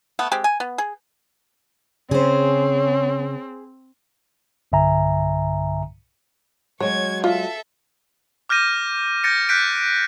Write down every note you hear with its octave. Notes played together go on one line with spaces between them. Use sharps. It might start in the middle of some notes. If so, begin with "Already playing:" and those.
A3 B3 F#5
G#3 C4 G4
G#5
B3
G#4
C#3 C4 G#4 C5 C#5
B1 G2 D3 E5 G#5 A#5
F#3 G#3 C#5 C#6 G#6
F4 A4 E5
D6 F6 G6 A#6 D#7
G6 A6 A#6 C#7 D7
F#6 G6 B6 D7